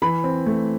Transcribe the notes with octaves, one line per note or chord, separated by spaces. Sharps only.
E3 B5
C4
A3